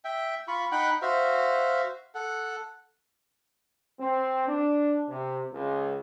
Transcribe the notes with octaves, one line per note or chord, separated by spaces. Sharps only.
E5 G5
F4 B5 C#6
D#4 F#5 G5 B5
F#4 C5 E5 F5
A4 F#5
C4
D4
C3
C#2